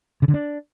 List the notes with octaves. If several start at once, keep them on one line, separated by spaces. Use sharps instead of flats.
C#3
D3
D4